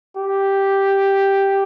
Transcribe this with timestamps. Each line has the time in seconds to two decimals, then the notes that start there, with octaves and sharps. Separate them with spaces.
0.17 G4